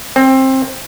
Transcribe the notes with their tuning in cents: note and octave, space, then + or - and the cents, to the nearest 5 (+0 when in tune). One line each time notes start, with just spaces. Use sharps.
C4 +20